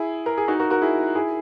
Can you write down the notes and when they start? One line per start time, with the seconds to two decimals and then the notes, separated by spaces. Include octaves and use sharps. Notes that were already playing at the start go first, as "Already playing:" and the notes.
Already playing: E4 G#4
0.26 A#4
0.37 G#4
0.48 D#4 F#4
0.60 F#4 A#4
0.70 F#4 A#4
0.82 E4 G#4
1.15 E4 G#4